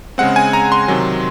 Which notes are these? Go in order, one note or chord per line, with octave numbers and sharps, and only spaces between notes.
C#3 G#3 C4 F#5
G#5
A#5
C6
C3 D#3 F#3